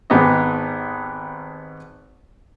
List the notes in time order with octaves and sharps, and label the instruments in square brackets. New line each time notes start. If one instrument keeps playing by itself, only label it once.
[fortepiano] G#1 G#2 B3 D#4 G4 D#5